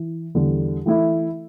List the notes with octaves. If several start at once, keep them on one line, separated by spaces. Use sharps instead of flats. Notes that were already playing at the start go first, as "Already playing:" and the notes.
Already playing: E3
E2 D3 G3
E3 A3 E4